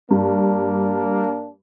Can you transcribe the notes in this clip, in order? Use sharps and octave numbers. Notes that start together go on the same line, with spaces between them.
G2 A#3 D4